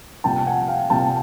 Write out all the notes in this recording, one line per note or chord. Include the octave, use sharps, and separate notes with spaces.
C2 A#2 F3 G5 A5
F#5 G#5
F5 G5
C2 A#2 F3 G5 A5